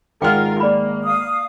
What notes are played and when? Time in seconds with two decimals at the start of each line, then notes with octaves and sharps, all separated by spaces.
0.22 G#1 G#3 F4 A#4 F#5 G5 D6 F6
0.60 A#3 D5 B5
1.03 F5 D#6